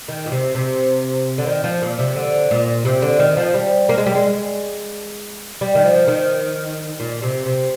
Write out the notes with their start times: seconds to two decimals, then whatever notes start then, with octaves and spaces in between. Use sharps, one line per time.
0.08 D#3
0.26 A#2
0.32 C3
0.55 C3
1.38 D3
1.47 D#3
1.64 F3
1.82 A#2
1.99 C3
2.16 D3
2.51 A#2
2.85 C3
3.02 D3
3.19 D#3
3.37 F3
3.54 G3
3.89 A#3
3.98 G#3
4.06 G3
4.15 G#3
5.61 G3
5.75 D#3
5.84 F3
6.07 D#3
7.00 A#2
7.22 C3
7.46 C3